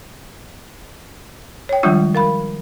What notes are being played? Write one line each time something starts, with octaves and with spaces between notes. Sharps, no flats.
C#5 G5
D#3 F3 G3 G#3 D4 F4
A#4 F5 B5